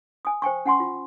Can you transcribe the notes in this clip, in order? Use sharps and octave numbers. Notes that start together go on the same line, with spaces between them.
G#5 D#6
C5 G5 G#5 C#6
C#4 F#5 G#5 C6 C#6
F4